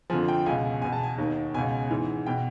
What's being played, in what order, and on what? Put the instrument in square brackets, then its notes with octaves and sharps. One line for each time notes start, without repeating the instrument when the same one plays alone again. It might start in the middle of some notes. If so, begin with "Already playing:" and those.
[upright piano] F3 G#5
F2 D3
G5
C#2 B2 G#5
E2 B2 G#5
A5
G#5
D#2 D#3
C#2 B2 G#5
G#2 E3
B2 G5